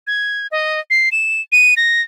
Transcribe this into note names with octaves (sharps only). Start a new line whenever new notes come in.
G#6
D#5
C7
E7
D#7
A#6